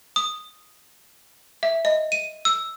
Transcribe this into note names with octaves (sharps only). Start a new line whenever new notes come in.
D#6
E5
D#5
D#7
E6